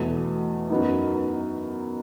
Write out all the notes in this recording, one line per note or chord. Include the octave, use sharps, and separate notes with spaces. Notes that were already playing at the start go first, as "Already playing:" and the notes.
Already playing: E2 B2 A3
F#2 F#3 B3 D#4